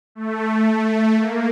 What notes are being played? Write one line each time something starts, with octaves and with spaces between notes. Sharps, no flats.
A3
A#3